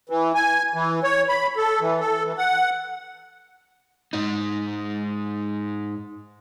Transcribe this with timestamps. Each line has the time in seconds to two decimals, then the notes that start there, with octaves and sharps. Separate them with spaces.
0.09 E3
0.35 G#5
0.74 E3
1.04 C#5
1.29 B5
1.57 A4
1.81 E3
2.00 A4
2.24 E3
2.38 F#5
4.13 G#2 D#4